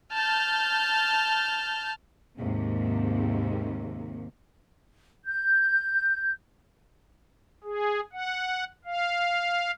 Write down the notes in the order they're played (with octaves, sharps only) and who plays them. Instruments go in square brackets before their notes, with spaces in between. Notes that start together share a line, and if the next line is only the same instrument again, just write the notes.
[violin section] A5 F6 G6
[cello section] D#2 G#2 C3
[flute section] G6
[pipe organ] G#4
F#5
F5